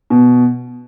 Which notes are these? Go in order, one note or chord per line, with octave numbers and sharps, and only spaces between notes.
B2